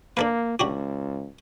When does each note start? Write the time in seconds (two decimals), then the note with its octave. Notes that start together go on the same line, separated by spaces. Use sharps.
0.17 A#3 D4 A4 B4
0.59 C#2 D4 F#4 G4